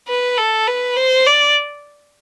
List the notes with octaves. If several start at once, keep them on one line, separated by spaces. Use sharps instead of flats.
B4
A4
B4
C5
D5